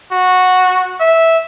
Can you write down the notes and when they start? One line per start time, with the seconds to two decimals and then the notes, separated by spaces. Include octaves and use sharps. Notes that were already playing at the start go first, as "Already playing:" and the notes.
0.12 F#4
1.00 E5